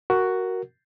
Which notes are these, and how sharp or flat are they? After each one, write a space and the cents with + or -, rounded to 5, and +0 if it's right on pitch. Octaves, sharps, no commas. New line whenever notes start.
F#4 +5 A#4 +0